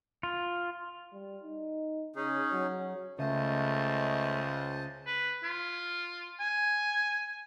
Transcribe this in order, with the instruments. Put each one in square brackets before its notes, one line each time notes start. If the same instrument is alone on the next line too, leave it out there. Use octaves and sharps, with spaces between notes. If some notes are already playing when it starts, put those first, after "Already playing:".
[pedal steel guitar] F4
[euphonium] G3
D#4
[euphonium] C#3 [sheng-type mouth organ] C#4 D#4 G#4
[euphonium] F#3
[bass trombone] C#2 [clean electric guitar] C#3 [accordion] A3 [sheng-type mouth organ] C5 D#5 A5
[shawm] B4
F4
G#5